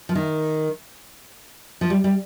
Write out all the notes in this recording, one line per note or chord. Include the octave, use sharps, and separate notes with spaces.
F3
D#3
F3
G3
G3